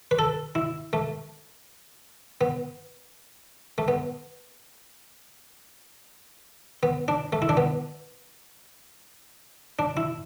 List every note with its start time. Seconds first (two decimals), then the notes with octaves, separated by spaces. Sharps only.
0.11 B4
0.19 A4
0.55 E4
0.93 A3
2.41 B3
3.78 A3
3.88 B3
6.83 B3
7.08 D4
7.33 A3
7.42 E4
7.49 D4
7.57 B3
9.79 D4
9.97 E4